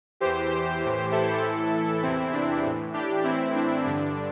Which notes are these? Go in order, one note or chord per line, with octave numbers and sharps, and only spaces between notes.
E2 E3 G4 C5
G4 C5
A2 E3
E4 A4
A2 E3
E2 C3 E3 C4 E4
D4
A2 E3
D4 G4
A2 E3 C4 E4
D4
G2 D3 D4